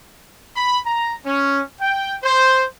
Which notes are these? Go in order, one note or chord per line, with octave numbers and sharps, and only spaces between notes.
B5
A#5
C#4
G5
C5